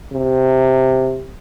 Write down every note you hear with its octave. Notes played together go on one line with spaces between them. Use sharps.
C3